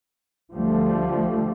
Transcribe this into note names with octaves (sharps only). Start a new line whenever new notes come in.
D2 D3 F3 G3 A3